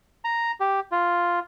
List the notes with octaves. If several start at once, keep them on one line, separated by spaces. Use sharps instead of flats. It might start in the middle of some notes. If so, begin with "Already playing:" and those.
A#5
G4
F4